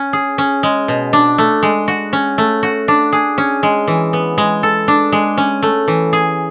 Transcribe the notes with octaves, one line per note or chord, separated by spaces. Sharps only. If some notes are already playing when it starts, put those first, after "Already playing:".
Already playing: C#4
G#4
C#4
G#3
B2
D4
A3
G#3
F#4
C#4
A3
F#4
D4
G#4
C#4
G#3
E3
B3
G#3
A4
D4
G#3
C#4
A3
E3
G#4